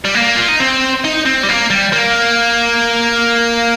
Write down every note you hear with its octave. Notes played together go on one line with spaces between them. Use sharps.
G3
A#3
F4
D#4
C4
D#4
C4
G3
A#3
G3
A#3